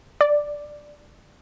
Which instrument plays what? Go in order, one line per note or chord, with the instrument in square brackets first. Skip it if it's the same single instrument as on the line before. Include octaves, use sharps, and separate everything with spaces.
[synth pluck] D5